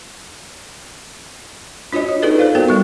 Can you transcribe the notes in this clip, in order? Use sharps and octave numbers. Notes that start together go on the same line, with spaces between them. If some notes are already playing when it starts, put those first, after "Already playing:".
D4 F4 F#4 C#5 D#5
F4
D#4 F4 G#4 A4 B4 D5
A4 C5 D5 F5
B3 F#4 A4 A#4 G5
G3 C#6